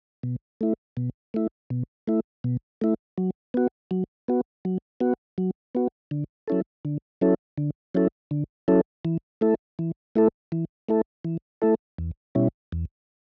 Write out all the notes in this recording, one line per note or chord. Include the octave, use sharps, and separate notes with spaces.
B2
A3 E4
B2
A3 E4
B2
A3 E4
B2
A3 E4
F#3
B3 F#4
F#3
B3 F#4
F#3
B3 F#4
F#3
B3 F#4
D3
F#3 C#4 E4 A4
D3
F#3 C#4 E4 A4
D3
F#3 C#4 E4 A4
D3
F#3 C#4 E4 A4
E3
A3 E4 A4
E3
A3 E4 A4
E3
A3 E4 A4
E3
A3 E4 A4
E2
B2 G3 C#4 E4
E2